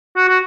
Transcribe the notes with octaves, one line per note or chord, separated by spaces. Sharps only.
F#4
F#4